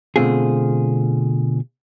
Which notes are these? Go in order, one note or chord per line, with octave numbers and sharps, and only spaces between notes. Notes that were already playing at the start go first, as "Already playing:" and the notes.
B2 D3 A3 C4 F4 G#4